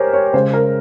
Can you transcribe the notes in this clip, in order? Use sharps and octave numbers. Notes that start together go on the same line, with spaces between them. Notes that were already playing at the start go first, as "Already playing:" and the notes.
Already playing: G4 G#4 A#4 C5 C#5
C#5
C#3 G#3 C5
A#4